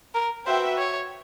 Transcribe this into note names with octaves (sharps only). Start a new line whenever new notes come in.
A#4
F#4 B4 C5 E5 G5
C#5